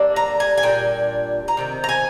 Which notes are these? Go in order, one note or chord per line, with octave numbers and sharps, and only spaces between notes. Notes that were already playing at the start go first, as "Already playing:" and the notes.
Already playing: D3 G3 A#3 D4
A#5
G#5
G#5
A#2 G3 D4 G5
A#5
C3 D#3 C4
A#5
G#5